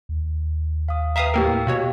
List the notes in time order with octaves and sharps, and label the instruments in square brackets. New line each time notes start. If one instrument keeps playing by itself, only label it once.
[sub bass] D#2
[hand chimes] F5 D#6
[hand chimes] B4 G5 A#5 [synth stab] E5 F5 D#6
[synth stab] A2 A#3 A#4 [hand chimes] G4 G5 E6
[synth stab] B2 F#4 C#5 [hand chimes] F5